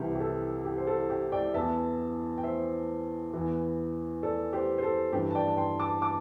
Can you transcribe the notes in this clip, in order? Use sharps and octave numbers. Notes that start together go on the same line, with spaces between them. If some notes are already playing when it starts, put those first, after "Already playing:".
Already playing: C2 C3 E3 G4
G4
A4
G4
C5
A4
G4
D5 G5
E2 E3 E5 A5
G5
C5 E5
E2 E3
A4 D5
G4 C5
C5
A4
G2 E3 G4
A5
D5 G5
A5
G5 C6
A5 D6
A5 D6